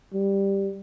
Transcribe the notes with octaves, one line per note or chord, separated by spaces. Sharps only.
G3